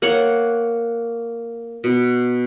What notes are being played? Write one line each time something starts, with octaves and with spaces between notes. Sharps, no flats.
A#3 C#5 F#5
B2